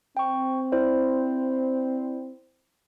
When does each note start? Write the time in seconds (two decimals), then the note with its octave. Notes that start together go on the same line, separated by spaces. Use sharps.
0.17 C4 G5 C#6
0.72 E4 C5 D5